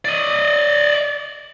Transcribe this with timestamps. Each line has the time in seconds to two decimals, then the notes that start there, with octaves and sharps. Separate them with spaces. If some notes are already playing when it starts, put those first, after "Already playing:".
0.05 D5 D#5